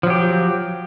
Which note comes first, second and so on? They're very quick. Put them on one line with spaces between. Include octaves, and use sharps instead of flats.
F3 F#3 G4